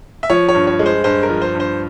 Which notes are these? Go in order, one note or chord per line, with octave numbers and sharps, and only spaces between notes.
E5
F3 C#5
C#5
G2
C#5
G#3
C5
G2 C5
A#4
F3
C5
G2
C5